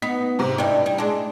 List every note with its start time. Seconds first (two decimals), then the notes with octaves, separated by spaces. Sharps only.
0.02 B3 D#4 B6
0.39 G#2 C3
0.58 G2 G3 D#4 E4
0.86 G3
0.98 G#3 D4